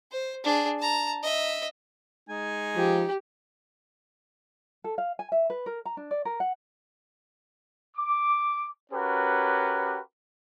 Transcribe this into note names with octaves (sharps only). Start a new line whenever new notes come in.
C5
D4 G#4
A5 A#5
D#5 E5
G#3 D#4 G#5
F3 G4
A4
F5
G#5
E5
B4
A#4
A#5
D4
D5
A#4
F#5
D6
C#4 F#4 G4 A#4 B4